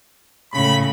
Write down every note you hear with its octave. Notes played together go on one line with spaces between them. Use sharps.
A2 C#3 B5